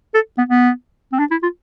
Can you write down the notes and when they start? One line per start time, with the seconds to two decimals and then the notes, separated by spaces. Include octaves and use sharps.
0.14 A4
0.38 B3
0.49 B3
1.12 C4
1.19 D4
1.31 E4
1.42 F4